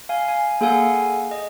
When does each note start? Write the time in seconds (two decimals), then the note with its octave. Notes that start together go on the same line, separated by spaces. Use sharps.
0.09 F5 G#5
0.28 G#5
0.61 A#3 G#4 A4 F5 F#5 G#5
1.31 D#5